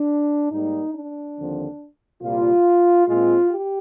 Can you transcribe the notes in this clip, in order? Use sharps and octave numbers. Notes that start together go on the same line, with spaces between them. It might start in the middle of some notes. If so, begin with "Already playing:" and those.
Already playing: D4
G#2 G3 A#3 D#4
D4
D#2 D3 F3 C4
C2 A#2 G3 A#3 F4
A#2 G#3 C4 F4
G4